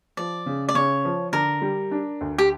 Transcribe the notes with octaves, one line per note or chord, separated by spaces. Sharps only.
F3 D5
C#3
D5
C#3 C#5
F3
D3 A#4
G3
D4
D2
G4